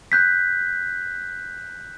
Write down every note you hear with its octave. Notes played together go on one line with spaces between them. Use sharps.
F#6 G6 B6